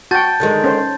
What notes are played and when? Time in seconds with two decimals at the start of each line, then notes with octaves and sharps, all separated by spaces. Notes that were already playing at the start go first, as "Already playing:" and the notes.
0.11 F#4 G5 A5 G6 A6
0.40 D3 D#3 G#3
0.64 C#4 C5